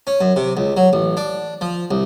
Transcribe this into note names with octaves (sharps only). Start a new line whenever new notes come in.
C#4
F#2
C3
C#2
F#3
A1
D4
F3
C2